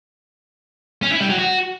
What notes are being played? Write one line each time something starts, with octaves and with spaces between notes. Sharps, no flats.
C#4
E4
G3
F#3
F#4